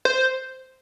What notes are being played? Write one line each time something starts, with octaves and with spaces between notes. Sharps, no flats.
C5